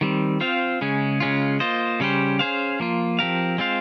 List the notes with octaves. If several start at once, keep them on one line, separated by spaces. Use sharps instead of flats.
D#3 G3 C4
C4 F4 C5 F5
C#3 G#3 C#4
C#3 G#3 C#4 F4
A#3 F4 C5 D#5
C#3 G3 C#4 G4 C5
C#4 G#4 C5 F5
F3 A#3 F4
F3 C4 G4 A#4 F5
G#3 C4 F4 C5 F5